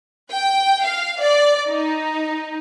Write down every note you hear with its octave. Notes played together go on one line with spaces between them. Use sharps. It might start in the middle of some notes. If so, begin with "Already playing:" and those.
G5
F5
D5
D#4